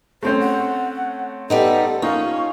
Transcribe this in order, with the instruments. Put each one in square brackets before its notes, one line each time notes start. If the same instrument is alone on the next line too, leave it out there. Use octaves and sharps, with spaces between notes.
[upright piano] A3 C4 C#4 [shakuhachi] C5
[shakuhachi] F#5
[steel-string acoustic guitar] G3 B3 D#4 [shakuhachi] A4
[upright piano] A#3 D#4 F4 [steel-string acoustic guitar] C#4 [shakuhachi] C#6